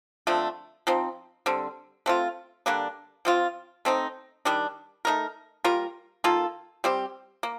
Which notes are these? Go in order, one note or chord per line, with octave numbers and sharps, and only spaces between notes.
D3 F3 A3 C4
F3 C4 D#4
D3 G3 C4
A3 C4 F4
D3 G3 A#3 D4
F3 C4 F4
A3 C4 D#4
D#3 G3 D4
A3 D#4 A#4
G3 A#3 F4 A#4
D#3 A#3 F4 A4
G3 C4 G4
A#3